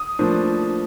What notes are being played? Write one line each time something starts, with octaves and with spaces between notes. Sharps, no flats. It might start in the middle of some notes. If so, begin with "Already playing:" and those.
Already playing: D#6
A2 F3 A#3 D4